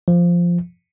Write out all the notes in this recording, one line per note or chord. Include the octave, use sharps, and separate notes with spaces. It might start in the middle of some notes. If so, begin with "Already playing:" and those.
F3